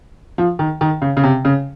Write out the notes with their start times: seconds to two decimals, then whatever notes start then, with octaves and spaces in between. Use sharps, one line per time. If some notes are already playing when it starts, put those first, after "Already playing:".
0.38 F3
0.59 D#3
0.81 D#3
1.02 C#3
1.17 C#3
1.23 C3
1.45 C#3